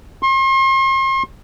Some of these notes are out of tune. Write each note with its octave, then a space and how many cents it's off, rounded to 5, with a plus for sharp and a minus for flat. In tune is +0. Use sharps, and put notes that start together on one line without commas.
C6 +40